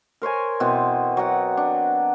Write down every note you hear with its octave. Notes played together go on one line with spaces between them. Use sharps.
A#4 C5 C#5 G#5
B2 E3 B3 C4
F#3 F#5
D4